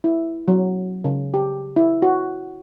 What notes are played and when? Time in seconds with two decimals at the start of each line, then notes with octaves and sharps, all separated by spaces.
0.04 E4
0.48 F#3
1.04 C#3
1.34 G4
1.76 E4
2.02 F#4